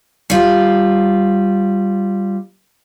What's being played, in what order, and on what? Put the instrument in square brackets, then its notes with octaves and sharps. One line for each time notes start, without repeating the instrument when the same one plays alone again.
[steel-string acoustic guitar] G3 F4